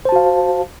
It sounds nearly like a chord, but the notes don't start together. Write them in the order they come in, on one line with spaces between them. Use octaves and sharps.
C5 A5 F#4 F5